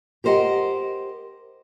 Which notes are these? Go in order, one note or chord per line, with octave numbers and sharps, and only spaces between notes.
G4 A#4 C5 D#5 F#5